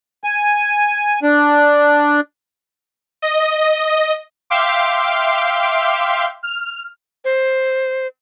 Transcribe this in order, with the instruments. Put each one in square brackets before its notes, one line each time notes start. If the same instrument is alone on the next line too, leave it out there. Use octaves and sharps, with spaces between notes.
[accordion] G#5
D4
[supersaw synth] D#5
[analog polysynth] E5 F5 G5 C6 D6
F6
[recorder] C5